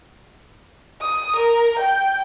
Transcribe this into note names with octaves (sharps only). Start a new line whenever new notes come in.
D#6
A#4
G5